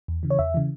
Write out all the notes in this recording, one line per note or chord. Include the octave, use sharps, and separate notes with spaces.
E2
C#3 E3
C#5
E2 E5
C#3 E3